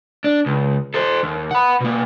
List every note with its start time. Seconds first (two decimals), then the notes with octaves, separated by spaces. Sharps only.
0.24 D4
0.46 C#2
0.94 A4 C5
1.23 D#2
1.51 F#5 B5
1.81 B2 A#3